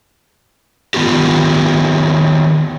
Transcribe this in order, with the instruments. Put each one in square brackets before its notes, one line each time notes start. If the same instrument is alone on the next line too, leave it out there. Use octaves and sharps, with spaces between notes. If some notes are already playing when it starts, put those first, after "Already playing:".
[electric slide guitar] D#3 B3 F4 G4